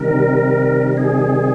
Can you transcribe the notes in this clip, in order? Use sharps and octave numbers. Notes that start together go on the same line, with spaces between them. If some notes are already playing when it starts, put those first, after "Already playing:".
Already playing: C3 D#3 G3 A#4
G#4